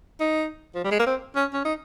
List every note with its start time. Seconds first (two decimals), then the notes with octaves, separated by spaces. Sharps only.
0.20 D#4
0.75 F3
0.84 G3
0.91 G#3
0.99 A#3
1.07 C4
1.36 C#4
1.54 C#4
1.65 D#4